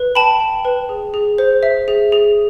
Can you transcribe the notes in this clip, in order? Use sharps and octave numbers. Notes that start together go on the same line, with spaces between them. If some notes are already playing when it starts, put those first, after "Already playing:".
Already playing: B4
G5 A5 B5
G5
B4
G#4
G#4
C5
E5
G#4
G#4